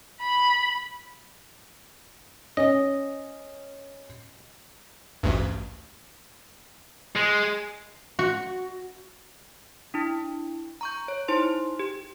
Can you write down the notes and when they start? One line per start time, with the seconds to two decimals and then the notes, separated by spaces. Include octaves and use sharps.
0.21 B5
2.57 C#4 D#5
5.23 A1 D2 G2
7.16 G#3
8.19 F#4
9.94 D4 E4
10.81 A#5 C#6 G6
11.08 C#5
11.28 D#4 E4 C5 C6
11.79 G4